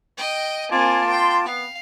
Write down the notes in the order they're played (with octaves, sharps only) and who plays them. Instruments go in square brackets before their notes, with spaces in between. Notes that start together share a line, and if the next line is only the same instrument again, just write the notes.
[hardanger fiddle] D#5 G5
[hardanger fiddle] A#3 C4 [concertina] F4 A5 D6 [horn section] G#5
[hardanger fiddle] G5 [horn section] C6
[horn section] B3 [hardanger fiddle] F5